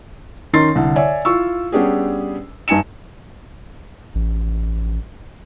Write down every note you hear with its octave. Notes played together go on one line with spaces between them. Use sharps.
D#3 C#4 D#4 C6 A6 C7
C2 D3
C#5 D5 E5 G#5
E4 F4 C#6 E6
G3 B3 C#4 D4 G4 G#4
G2 D#4 G#5 C#7 E7
A1